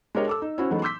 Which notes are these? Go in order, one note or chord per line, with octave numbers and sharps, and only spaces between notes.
G#3 D4 G4 A#4 C#5 D#5
A4 D6 E6
D#4
C#4 E4 F#4 C5
E3 F#3 G#3 A3 B3 D#4
C6 D6 E6 G6 B6